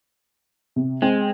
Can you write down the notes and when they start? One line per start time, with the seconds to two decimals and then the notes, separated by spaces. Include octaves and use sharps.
0.76 C3
1.02 G#3 C4